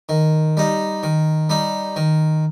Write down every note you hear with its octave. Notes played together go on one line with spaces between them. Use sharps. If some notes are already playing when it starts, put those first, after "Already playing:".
D#3
G3 D#4
D#3
G3 D#4
D#3